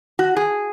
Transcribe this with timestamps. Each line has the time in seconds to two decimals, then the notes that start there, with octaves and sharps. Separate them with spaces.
0.19 F#4
0.36 G#4